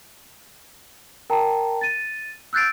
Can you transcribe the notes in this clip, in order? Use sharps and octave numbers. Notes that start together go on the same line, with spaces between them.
A#4 G5 A5 A#5
A6 D#7
E6 F#6 G6 A6 C7 D7